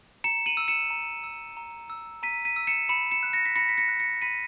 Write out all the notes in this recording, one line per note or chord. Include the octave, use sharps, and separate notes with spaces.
A#5 C#7 E7
D#7 F#7
E6
C#7 E7
A#5
E6
A#5
E6
A#5 B6 D#7
B6 D#7
E6
C#7 E7
B5 C#7 E7
C#7 E7
F#6
A#6 C#7
B6
B5 A#6 C#7
B6
A#6 C#7
F#6
A#6 C#7
B5 B6 D#7